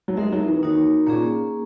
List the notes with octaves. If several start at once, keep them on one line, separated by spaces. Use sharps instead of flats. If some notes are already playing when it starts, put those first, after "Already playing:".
F#3
G#3 D#4 A#4 E5
F#3
E3
D#3 A#3 D#4 F#4 A#4 C#5
A#2 A#3 C#4 G#4